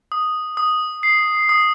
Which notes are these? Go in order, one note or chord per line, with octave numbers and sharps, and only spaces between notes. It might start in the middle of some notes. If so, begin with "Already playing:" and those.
D#6
D#6
C7
D#6